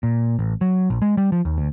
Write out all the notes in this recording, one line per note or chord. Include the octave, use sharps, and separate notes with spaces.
A#2
A1
F#3
A#1
G#3
G3
F3
D#2
D2